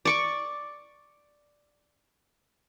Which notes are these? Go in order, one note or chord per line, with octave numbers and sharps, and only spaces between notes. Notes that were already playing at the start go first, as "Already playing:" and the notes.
D5 C#6 D6